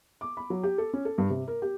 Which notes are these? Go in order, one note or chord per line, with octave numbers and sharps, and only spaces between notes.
D6
B5
F#3
G4
A4
C#4
A4
G2
C3
A#4
G4